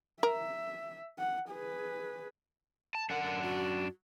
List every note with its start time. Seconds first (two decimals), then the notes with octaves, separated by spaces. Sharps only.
0.23 A#4 E5
1.19 F#5
1.50 G#4 B4
2.95 A5
3.10 F#2 D4 A#4 F#5
3.24 A#4
3.42 F#4